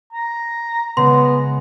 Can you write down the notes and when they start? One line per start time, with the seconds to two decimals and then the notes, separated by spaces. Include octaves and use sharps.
0.13 A#5
0.97 C#3 G#3 B3 C6